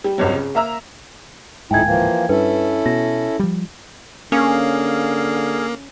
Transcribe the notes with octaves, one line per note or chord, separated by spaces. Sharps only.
G3
G#1 C#2 G2 F#3
C#3
A#3 E5 A#5 E6
D1 F2 G#2 D#4 E4 G5 G#5 G#6
E3 F3 A#3
G2 C#4 E4 A4 B4
B2 A#6
F3 G3
D3 A#3 C#4 G#4 F5